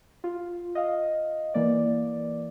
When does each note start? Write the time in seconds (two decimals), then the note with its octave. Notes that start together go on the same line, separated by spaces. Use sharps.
0.24 F4
0.75 D#5 F5
1.54 E3 A#3 D5